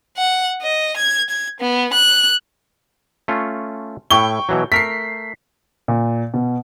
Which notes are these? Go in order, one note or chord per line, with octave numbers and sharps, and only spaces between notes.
F#5
D#5
G#6
G#6
B3
F#6
A3 C#4 F4
A2 E4 G5 C#6 G7
B2 E3 F#3
A3 A#4 B6 C7
A#2
B2